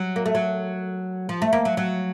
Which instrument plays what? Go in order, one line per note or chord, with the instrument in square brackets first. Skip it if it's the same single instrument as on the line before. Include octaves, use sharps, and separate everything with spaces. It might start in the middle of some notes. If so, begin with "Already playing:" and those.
Already playing: [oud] F#3
A#3
A3
F#3
F3
A3
A#3
F#3
F#3